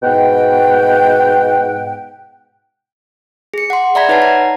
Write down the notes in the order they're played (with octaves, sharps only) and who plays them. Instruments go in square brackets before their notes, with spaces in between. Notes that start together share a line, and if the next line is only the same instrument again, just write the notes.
[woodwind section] G#2 B2 F#5 G5
[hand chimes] G#4 C#7
F#5 C6
D5 E5 A#5 B5 G#6 B6
D#4 B4 C#5 F#5 A5 C7
A#5